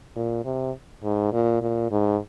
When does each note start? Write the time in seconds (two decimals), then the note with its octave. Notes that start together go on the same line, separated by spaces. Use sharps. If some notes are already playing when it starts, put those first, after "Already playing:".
0.16 A#2
0.45 C3
1.03 G#2
1.33 A#2
1.62 A#2
1.91 G#2